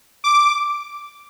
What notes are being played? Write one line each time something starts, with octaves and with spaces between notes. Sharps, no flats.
D6